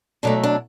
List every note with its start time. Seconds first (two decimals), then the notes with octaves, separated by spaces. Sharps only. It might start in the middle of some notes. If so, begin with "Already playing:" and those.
0.23 B2 F#3 A3 D4
0.43 D4